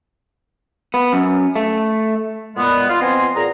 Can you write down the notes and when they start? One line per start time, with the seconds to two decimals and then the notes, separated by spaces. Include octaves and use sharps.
0.94 B3
1.13 F#2
1.56 A3
2.56 A#2 G#3 B3
2.89 F4
3.01 F3 B3 C4 D#5 G#5 C6
3.36 A#2 G#4 A#5